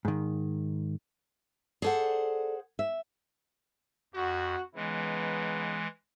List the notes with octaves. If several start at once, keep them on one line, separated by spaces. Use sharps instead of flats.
G#2 D#3
G#4 A4 C5 D5 F#5
E5
F2 F#4
C#3 E3 G#3 B3 D#4